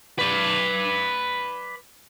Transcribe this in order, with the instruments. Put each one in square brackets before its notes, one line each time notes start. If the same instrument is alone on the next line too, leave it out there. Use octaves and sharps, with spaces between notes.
[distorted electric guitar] B4 D5